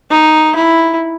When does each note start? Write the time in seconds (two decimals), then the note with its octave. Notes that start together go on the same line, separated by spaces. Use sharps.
0.10 D#4
0.55 E4